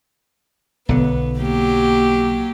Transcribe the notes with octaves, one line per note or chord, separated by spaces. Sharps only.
B1 D3 B3
F#3 A#3 G4